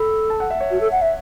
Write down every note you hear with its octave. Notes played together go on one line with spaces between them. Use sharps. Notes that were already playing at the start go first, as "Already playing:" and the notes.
Already playing: A4 B5
A5
F#5
E5
C#5
F#4
A4
F#5
E5